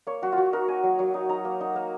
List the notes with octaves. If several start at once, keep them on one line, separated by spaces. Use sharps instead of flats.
A#3 C#5
F#3 F#4
F4
F#3 F#4
D#4 A#4
A#3 G#5
F#3
F#3
D#4
D#4 A#5
A#3
D#4
A#3